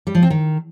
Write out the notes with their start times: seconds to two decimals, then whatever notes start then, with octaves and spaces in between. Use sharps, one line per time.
0.07 G3
0.15 F3
0.22 C4
0.30 D#3